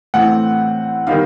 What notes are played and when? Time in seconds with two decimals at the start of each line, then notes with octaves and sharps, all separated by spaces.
0.14 A2 E3 A3 C4 F#5
1.07 D#3 G3 B3 D#4 F5